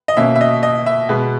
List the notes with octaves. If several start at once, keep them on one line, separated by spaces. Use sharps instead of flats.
D#5
B2 A#3 C#4 E5
E5
D#5
D#5
E5
B2 G#3 B3